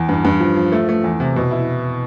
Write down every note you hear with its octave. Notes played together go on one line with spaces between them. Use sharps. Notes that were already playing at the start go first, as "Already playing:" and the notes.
Already playing: E2
G2
G2
F3
F3
A3
A3
E2
C3
B2
E4